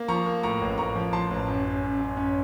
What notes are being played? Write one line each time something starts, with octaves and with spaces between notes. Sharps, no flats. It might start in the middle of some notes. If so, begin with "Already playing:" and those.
Already playing: A#3
F3 A#5 C#6
A#3
A2 A#5 C#6
A1
A1 A#5 C#6
F3
F3 A5 C6
A1
F#2
C#4
F#2
F#2
C#4